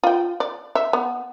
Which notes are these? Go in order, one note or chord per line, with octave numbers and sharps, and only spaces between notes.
F4 G5
D5
E5
B3